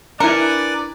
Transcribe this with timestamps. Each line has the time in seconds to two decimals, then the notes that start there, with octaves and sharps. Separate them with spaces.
0.20 D4 E4 A#4 B4 D5 G#5 C#7